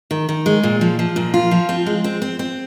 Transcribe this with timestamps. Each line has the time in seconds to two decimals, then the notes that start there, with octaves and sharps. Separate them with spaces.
0.11 D#3
0.29 D#3
0.46 G#3
0.63 A#2
0.81 F3
0.99 F3
1.16 A#2
1.34 F4
1.51 F3
1.69 C4
1.86 G#3
2.04 C4
2.22 C4
2.39 C4